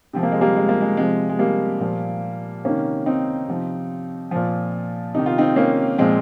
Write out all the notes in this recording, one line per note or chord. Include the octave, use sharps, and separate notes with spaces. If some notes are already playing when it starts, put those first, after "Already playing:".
C3 F3 C4
A#3
G#3
G3 A#3
G#3
A#3
G#3
C3 F3 G#3
G#3
G3 A#3
A#2 F3
C3 D#3 A#3 C#4
C4 D#4
C3 F3
A#2 F3
C3 D#3 D#4
F4
C4 D#4
A#3 C#4
A#2 F3 G#3 C4